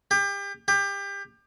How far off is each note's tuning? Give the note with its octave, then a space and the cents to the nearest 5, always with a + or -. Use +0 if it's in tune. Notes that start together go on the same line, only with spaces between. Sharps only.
G4 +30
G4 +25